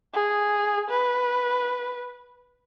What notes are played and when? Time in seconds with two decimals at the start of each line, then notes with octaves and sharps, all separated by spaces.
0.14 G#4
0.90 B4